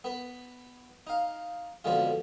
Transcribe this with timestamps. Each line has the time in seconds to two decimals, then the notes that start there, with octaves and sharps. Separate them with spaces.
0.04 B3 B4
1.07 D#4 F5
1.84 F2 B2 D3 G#3 F4